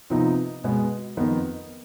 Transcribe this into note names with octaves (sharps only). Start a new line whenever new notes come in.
C3 F3 B3 D#4
B2 G#3 B3
F2 D#3 B3 D#4